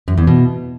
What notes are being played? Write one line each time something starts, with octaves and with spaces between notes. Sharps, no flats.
F#2
E2
B2